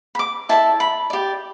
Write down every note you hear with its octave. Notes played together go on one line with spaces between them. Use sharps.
B5
D6
E4 A4 D5 A5
B5
G4 D5